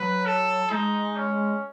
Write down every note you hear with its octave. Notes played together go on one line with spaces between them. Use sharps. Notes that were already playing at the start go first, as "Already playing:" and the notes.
Already playing: F#3 B4
A4
G#3 D#4
C#4